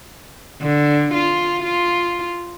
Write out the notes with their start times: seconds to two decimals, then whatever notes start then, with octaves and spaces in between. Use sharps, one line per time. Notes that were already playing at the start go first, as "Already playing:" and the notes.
0.62 D3
1.14 F4
1.63 F4